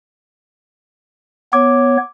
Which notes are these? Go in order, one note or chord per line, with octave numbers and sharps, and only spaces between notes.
B3 C#5 D6